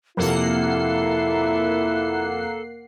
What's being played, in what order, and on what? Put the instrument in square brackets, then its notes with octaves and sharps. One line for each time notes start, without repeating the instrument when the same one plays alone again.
[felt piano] F2 C3 [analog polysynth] A#3 F#5 C7 [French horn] E4 [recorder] A4